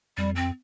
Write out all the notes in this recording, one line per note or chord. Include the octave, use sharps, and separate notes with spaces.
F2 G3
C4